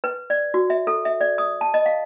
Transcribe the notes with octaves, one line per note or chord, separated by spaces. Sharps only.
B4
D5
F#4
E5
A4
E5
D5
D#6
A5
D#5
F5